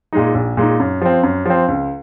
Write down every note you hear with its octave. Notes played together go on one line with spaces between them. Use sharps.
A#2 G#3 D#4
A#1
A#2 G#3 D#4
F#2
F3 C4
F#2
F3 C4
C#2